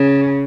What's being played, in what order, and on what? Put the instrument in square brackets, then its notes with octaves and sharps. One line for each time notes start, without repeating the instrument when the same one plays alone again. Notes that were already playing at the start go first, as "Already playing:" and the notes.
Already playing: [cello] C#3